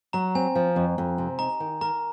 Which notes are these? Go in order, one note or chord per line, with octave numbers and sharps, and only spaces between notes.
F#3 A#5
C4 G#5
F3
F2
F2
C3
D#4 A#5
D#3
A#4 A#5